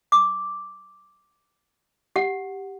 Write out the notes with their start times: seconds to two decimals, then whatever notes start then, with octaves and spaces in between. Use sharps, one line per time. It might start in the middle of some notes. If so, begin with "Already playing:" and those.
0.12 D6
2.16 G4 F#5